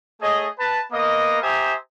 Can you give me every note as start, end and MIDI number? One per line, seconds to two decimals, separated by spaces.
0.22 0.48 57
0.22 0.48 68
0.22 0.48 73
0.22 0.48 75
0.59 0.80 71
0.59 0.80 81
0.92 1.41 58
0.92 1.41 59
0.92 1.41 70
0.92 1.41 75
1.42 1.75 67
1.42 1.75 72
1.42 1.75 76
1.42 1.75 80
1.42 1.75 82
1.42 1.75 87